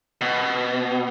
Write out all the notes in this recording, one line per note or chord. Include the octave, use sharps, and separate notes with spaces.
B2